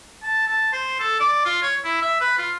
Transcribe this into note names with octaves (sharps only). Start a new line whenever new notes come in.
A5
A5
C5
A4
D5
F4
C#5
E4
E5
B4
F4